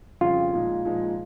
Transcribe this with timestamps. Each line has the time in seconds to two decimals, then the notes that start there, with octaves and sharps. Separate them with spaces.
0.21 F2 C#3 G3 C4 F4
0.53 A#2 F3 G#3 D#4
0.85 A#2 F3 G#3 D#4